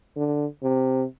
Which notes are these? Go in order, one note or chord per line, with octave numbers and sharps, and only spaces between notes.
D3
C3